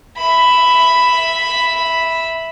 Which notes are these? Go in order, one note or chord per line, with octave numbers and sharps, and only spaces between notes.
E5 B5